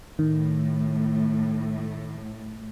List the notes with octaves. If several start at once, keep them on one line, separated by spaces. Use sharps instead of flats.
A2 D#3